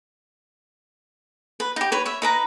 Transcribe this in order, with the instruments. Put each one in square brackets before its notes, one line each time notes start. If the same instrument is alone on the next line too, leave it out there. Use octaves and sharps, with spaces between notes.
[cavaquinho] B4
D#4 G4
B4 C#5
C#5 E5
D#4 B4 A#5